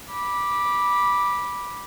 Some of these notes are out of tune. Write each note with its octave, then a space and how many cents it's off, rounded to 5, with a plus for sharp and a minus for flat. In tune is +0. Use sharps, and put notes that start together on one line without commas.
B5 -15 D6 +0